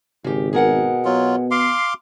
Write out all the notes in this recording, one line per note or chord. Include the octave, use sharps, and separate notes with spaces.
G#1 C#3 G4
B2 G#4 A#4 F#5
F#3 B3 F4
F5 C6 D6